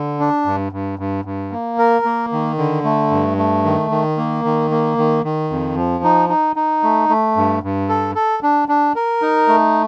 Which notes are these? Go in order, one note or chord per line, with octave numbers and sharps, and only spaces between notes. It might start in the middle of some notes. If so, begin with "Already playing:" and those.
Already playing: D3
D4
G2
G2
G2
G2
A#3
A#4
A#3
D#3
D3
A3
G2
A3
D#3
D#3
A#3
D#3
A#3
D#3
D#3
F2
F3
D#4
D#4
D#4
A3
A3
G2
G2
A4
A4
D4
D4
A#4
D#4
A3